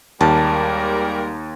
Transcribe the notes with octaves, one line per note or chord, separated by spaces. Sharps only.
D#2 G3 G#3 A#3 A#4 A5